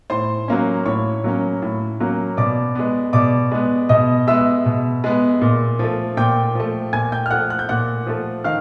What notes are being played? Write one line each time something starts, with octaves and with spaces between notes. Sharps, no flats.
A2 C5 C6
F#3 A#3 C#4
A2 C#5 C#6
F#3 A#3 C#4
A2
F#3 A#3 C#4
B2 D5 D6
G#3 B3
B2 D5 D6
G#3 B3
B2 D#5 D#6
G#3 B3 E5 E6
B2
G#3 B3
A#2
F3 A3
A#2 G5 G6
F3 A3
A#2 G#5 G#6
G5 G6
F6
F3 A3 F#5 F#6
F#6
G6
A#2 F#5 F#6
F3 A3
D#3 F5 F6